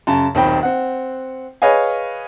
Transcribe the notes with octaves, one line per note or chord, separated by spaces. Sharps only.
F#2 C#3 A5
D#1 B1 D#3 C4 G5 B5
C4 F#5
G#4 B4 C#5 D#5 F5 G#5